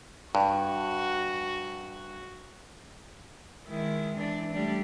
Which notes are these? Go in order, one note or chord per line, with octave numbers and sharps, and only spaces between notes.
G2 F#4
D#3 G#3 E4
E3 D4
G3 A3 D4